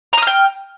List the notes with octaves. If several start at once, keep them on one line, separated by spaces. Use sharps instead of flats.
G5 A#5 D#6 F6